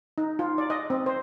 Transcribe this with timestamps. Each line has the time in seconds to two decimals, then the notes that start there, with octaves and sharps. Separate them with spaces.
0.18 D#4
0.39 F4
0.58 D5
0.70 D#5
0.90 C4
1.06 C5